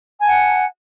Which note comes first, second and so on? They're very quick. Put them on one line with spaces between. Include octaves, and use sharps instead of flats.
G#5 A5 F#5